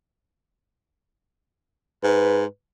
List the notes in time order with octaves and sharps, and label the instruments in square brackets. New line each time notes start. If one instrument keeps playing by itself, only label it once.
[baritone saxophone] G#2 [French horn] B4